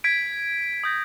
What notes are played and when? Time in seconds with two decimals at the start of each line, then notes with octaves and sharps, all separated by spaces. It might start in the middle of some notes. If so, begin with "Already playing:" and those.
0.04 G#6 B6 D7
0.84 D#6 G6 A#6